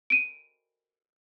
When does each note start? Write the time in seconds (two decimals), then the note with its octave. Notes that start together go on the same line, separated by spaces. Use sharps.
0.10 D7 D#7